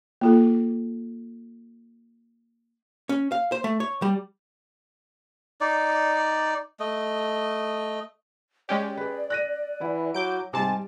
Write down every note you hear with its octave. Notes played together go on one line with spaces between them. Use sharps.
A#3 F4 A4
C#4
F5
C5
A3
C#5
G3
D#4 D5
A3 D#5
G#3 C#4 G4 D5
G#4 B4
F#6 A#6 D#7
E3 E4 F#5
F#3 D6 G6 D7
G#2 C3 G3 G#5 A5 C6 D6